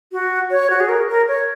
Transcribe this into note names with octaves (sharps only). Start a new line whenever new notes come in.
F#4
C#5
F#4
G#4
A#4
A#4
C#5